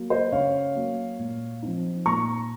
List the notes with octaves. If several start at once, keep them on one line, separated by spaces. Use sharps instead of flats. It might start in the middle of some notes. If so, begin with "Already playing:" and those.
Already playing: F#3 A#3
C5 D#5
C#3 C#5 F5
F#3 A#3
A#2
F3 C4 D#4
A#2 A#5 C#6